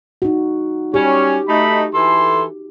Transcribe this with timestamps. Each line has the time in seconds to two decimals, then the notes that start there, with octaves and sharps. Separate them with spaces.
0.22 D#4 F#4
0.94 G3 C#4 G4 C#5
1.48 A3 D#4 B5
1.94 E3 A4 C6